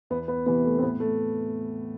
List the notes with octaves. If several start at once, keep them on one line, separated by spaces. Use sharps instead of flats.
E2 B3
B3
C3 E3 B3
A3
C4
A2 B3
A3